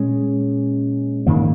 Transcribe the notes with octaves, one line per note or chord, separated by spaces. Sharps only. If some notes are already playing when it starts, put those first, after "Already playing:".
Already playing: A#2 G#3 C#4
G#2 D#3 A#3